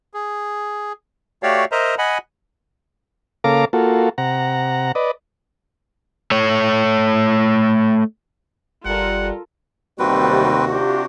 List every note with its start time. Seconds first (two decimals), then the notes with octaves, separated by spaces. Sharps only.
0.14 G#4
1.43 A3 F#4 G4 C#5 D5 F5
1.72 A#4 C5 D#5 E5 A#5
1.98 D#5 F#5 G#5 B5
3.44 C#3 A#3 A4 F5 A#5 D6
3.73 A#3 F4 F#4 A4
4.18 C3 F#5 A#5
4.95 B4 D5 D#5
6.31 A3 C#5
8.85 G1 G3 F4 A4 A#4 F#5
9.99 A1 D#2 C3 D#3 G3 C4 F#4 B4
10.71 D4 F4 G4